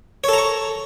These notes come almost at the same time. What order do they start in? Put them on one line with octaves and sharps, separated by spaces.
C#5 A4 A#5 C#6